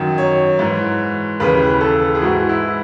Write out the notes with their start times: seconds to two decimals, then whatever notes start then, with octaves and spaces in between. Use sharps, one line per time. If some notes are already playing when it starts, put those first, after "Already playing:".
Already playing: F#2 D#3 F#3
0.18 C#5
0.59 G#2 E3
1.40 D#2 C#3 E3 B4
1.81 A4
2.15 G#4
2.22 G#2 E3 F#4
2.49 E4